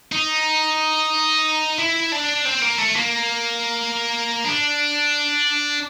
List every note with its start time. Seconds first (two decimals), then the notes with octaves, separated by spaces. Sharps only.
0.12 D#4
1.78 E4
2.12 D4
2.45 C4
2.62 A#3
2.78 A3
2.95 A#3
4.44 D4